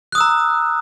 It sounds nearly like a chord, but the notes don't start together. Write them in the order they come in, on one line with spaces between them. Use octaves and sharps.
F#6 D#6 E6 A#5